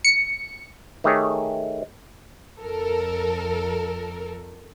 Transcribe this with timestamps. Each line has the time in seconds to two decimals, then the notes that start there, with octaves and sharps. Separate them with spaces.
0.05 C#7
1.04 D#3 A3 G4 G#4 C#5
2.60 F2 A4 A#4